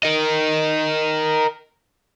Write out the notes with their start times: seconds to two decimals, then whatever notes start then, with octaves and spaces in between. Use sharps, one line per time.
0.04 A#4 D#5